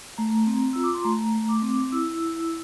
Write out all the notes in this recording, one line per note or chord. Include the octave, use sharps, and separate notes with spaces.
A3 A#5
C4
F4 E6
D6
C6
A3 A#5
A3
D6
C4
E4 E6
E4